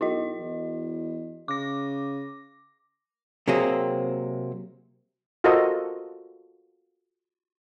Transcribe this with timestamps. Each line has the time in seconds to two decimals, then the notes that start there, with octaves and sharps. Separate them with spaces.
0.01 B1 E4 F#4 D#5
0.39 E2
1.48 C#3 D6 A#6
3.47 C3 F#3 A#3 C4 G#4
5.44 F4 F#4 A4 A#4 C5 D#5